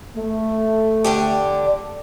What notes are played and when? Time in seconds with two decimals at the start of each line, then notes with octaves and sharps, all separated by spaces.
0.16 A3
1.04 D3 D4 G4